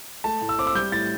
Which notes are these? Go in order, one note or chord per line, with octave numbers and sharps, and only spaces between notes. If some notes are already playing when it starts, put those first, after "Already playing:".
A3 A5
A2
E6
C4 D6
E6
G3 G6
A2 A6